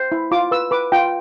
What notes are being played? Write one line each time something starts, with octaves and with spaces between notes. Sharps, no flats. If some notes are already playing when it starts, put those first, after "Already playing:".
Already playing: C5
E4
F4 D6
B4 E6
B4 D6
F4 G5